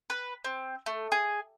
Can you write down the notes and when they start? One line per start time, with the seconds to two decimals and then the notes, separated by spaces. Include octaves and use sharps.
0.10 B4
0.44 C4
0.86 A3
1.12 G#4